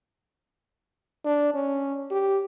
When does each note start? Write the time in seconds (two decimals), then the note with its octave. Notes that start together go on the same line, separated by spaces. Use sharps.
1.25 D4
1.54 C#4
2.11 G4